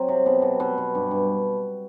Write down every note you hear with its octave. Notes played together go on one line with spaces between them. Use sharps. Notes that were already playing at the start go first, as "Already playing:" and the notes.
Already playing: F#3 C4
C3
B2
B2
B2
B2
G2
G2